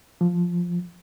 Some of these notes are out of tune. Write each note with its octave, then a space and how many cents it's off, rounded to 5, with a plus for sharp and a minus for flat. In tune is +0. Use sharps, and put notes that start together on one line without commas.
F3 +5